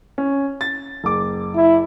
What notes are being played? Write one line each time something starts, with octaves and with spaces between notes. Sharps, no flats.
C#4
A6
F#1 D6
E4